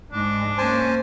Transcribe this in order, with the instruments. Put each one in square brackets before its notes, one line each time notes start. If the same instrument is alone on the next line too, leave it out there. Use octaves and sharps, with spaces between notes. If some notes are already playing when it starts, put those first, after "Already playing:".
[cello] G#2 G#3 [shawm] D4
[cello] A#3 C#4 [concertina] C5 G#5 A5